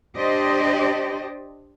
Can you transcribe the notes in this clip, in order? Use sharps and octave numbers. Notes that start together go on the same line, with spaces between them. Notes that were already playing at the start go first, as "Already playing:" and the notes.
D4 G4 C5 D5 D#5